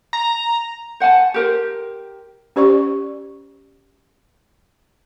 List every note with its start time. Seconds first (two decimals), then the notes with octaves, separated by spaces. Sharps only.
0.13 A#5
1.00 C5 F#5 G#5 A5
1.34 G4 A#4 C5
2.56 C#4 G4 C5 D5 C#6